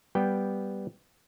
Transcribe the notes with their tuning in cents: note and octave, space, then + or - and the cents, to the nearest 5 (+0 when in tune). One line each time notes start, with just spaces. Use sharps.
G3 +0 B3 +0 G5 +0